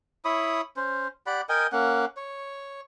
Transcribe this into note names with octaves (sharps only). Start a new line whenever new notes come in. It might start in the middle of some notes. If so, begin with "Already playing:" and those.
E4 C#5 B5 D#6
C#4 C5
G4 D5 F#5 B5
A#4 D#5 G5 G#5
A#3 C#4 F#5
C#5